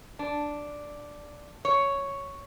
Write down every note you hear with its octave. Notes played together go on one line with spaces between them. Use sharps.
D4
C#5